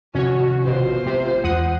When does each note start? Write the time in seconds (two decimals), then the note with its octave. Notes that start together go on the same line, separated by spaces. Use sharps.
0.15 C3 D#3 F3 C#4 F#4 C#5
0.65 A1 B2 F4 C5
1.06 C3 A3
1.44 E2 G#3 F#5 D#6